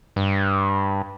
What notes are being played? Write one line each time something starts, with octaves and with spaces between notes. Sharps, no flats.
G2